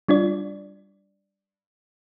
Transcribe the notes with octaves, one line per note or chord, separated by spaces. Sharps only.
G3 D4 F4 D5